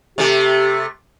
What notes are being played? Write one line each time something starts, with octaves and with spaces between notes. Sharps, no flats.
C3 A3 G4